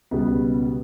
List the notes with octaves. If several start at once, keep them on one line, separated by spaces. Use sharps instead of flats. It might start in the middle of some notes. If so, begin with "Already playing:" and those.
C#2 B2 G3 B3